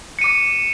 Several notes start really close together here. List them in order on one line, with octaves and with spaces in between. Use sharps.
C#7 D#7 D6